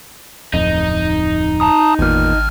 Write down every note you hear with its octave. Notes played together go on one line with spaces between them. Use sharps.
D1 F2 D#4
A5 A#5 D#6
G#1 E2 A#2 F6